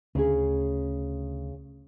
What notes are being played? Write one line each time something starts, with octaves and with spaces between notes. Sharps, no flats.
D2 C#3 C#4 G#4